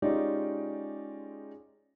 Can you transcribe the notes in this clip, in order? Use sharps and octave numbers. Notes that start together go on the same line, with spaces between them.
G#3 C#4 D#4 F4 G4 D5